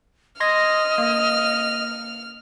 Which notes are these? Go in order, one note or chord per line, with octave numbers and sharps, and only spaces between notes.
D#5 C6 F6 G#6 A#6
A#3